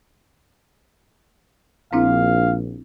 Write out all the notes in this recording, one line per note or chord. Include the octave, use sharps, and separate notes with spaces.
A#1 C4 D4 E4 F5